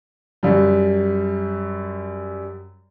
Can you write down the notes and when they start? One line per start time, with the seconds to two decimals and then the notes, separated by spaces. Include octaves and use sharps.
0.43 F#2 G3